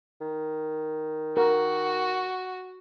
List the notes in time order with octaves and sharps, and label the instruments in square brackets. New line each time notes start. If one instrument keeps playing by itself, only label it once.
[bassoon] D#3
[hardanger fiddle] F#4 [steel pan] A#4